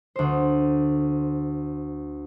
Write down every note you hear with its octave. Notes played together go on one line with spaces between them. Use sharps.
D2 C5